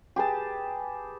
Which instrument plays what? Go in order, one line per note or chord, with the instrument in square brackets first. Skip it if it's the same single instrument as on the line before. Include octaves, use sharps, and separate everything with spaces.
[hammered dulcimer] G4 G#4 B4 A5